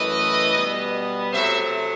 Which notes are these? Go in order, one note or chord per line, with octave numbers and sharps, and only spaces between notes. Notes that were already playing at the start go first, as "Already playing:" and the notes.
Already playing: F#2 E3 A3 B4 D#5
B2 G3 B3
C3 F#3 A3 C5 E5